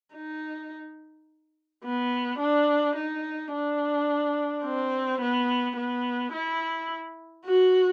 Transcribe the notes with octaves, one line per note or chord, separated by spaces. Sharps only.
D#4
B3
D4
D#4
D4
C4
B3
B3
E4
F#4